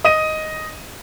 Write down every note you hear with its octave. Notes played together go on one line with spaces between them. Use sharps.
D#5 D#7